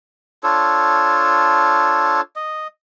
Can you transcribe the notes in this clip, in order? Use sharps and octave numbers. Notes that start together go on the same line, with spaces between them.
D4 F4 A4 C#5
D#5